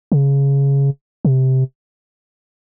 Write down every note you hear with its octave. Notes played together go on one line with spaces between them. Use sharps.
C#3
C3